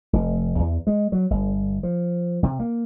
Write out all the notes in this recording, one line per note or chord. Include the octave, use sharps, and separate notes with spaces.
F1
E2
G#3
F#3
G1
F3
C3
A#3